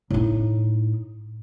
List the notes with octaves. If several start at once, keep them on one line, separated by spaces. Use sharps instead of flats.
A2 D#4